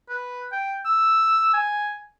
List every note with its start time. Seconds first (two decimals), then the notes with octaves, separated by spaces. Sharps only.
0.09 B4
0.52 G5
0.86 E6
1.54 G#5